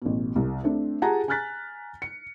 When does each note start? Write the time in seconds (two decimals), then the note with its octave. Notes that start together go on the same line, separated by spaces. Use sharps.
0.02 A1 B2
0.36 C2
0.63 A3 C4 D4
1.02 F4 G4 G#4 F#5 A5 A#5
1.28 G#5 A#5 F6 F#6 A6 B6
2.02 C#7